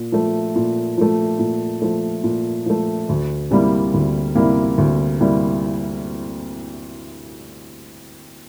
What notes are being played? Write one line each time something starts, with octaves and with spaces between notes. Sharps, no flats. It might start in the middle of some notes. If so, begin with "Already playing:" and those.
Already playing: A#2
F3 A3
A#2
F3 A3
A#2
F3 A3
A#2
F3 A3
D2
C3 G3 A#3 E4
D2
C3 G3 A#3 E4
D2
C3 G3 A#3 E4